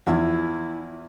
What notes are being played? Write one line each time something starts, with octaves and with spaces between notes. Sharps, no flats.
E2 E3 F3 E4